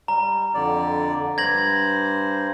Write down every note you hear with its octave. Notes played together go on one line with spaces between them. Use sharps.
G3 A#5
F2 D3 D5
G2 C5 G#6 A#6 F#7